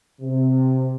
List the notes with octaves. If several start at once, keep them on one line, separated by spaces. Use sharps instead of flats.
C3